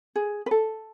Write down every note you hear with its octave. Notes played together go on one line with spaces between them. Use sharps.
G#4
B4
A4